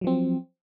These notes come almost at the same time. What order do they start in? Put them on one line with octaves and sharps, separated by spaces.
F#3 F3 C4